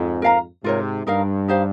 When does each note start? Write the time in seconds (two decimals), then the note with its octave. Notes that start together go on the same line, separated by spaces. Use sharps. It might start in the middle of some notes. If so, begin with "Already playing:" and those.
Already playing: F2 G#2
0.22 A#4 F5 A#5
0.64 G#2 C3 F4 A#4 C#5
1.06 G2 D#4 A#4 F5
1.48 D#4 G4 C5 F5